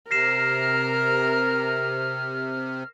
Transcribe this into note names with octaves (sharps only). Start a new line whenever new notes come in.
C3 A#4 F6 A#6 C7 E7